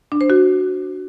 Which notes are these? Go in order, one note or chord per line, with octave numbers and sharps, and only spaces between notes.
D4
C5
F#4